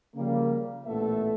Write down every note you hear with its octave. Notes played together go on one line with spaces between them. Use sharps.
C#3 F3 G3 A#3
A1 A#2 A3 B3 A4 E5